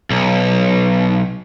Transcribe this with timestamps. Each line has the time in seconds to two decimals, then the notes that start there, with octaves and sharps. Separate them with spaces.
0.10 B1